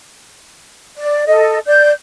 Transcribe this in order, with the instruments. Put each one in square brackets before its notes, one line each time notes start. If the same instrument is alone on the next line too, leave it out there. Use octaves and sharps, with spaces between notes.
[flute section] D5
A4 D#5
D5 G6